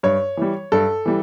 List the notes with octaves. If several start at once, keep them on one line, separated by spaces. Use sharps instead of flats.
G2 C#5
E3 G3
G2 A4
E3 G3